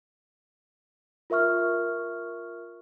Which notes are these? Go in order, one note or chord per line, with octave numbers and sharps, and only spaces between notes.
F4 A#4 E5 C#6 F6